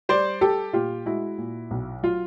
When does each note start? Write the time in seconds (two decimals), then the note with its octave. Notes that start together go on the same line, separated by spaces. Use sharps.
0.09 G3 C5 D5
0.41 G3 G4 A4
0.73 A#2 F4 G4
1.06 G#3 E4 F#4
1.38 A#2
1.71 B1
2.03 F#3 F4